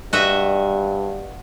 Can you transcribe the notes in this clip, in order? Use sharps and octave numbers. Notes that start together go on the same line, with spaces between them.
G2 F#4 D#5 E5